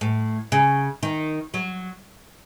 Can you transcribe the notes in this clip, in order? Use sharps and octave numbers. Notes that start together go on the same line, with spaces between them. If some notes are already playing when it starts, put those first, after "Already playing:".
A2
C#3
D#3
F#3